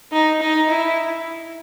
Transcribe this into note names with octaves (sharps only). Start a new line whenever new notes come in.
D#4
D#4
E4